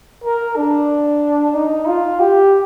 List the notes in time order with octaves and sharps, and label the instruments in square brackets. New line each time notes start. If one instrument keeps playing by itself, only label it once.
[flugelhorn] A#4
D4
D#4
F4
G4